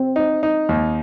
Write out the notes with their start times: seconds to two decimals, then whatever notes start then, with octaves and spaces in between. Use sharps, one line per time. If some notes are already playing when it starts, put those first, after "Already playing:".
Already playing: C4
0.16 D#4
0.43 D#4
0.69 D#2